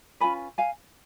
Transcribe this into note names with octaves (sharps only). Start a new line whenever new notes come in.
C#4 F4 B4 G#5 B5
F5 G#5